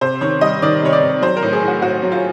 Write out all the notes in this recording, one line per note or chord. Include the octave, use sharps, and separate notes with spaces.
C3 C5
D#3 C#5
G3 D#5
D#3 D5
C3 C#5
D5
C3
F#3 C5
A#4
A2
G#4
A2
F#4
A2 F#4
F#3
F4